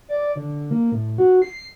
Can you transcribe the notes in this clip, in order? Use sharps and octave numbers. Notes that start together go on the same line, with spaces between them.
D5
D3
A#3
A2
F#4
C7